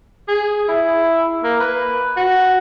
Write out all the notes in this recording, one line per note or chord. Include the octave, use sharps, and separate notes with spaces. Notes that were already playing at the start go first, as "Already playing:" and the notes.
G#4
E4
A#3
B4
F#4